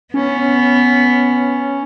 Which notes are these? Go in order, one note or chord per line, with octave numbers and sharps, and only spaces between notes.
B3 C#4